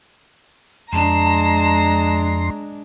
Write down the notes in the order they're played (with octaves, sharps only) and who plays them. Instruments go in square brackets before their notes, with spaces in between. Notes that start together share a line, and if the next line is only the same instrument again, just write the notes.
[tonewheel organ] F2 C6 [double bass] G#3 D4 [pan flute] A5 [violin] A#5